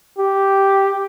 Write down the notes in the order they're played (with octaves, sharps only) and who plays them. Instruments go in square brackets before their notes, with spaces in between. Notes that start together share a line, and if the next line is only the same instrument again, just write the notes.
[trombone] G4